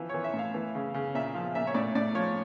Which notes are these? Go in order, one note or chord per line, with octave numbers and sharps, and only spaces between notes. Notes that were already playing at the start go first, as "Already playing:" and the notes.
Already playing: E3 F3
C#5
E3
E5
A2
F5
E3
C#3
C#3
A#2 E5
F3 F5
A#2 E5
C#5
A2 D5
A2 D5
F3 C#5